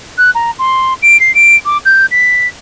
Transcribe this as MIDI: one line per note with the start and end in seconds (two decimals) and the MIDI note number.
0.18 0.30 90
0.35 0.51 82
0.59 0.94 84
1.02 1.19 98
1.20 1.34 96
1.35 1.55 98
1.65 1.78 86
1.85 2.06 91
2.11 2.47 95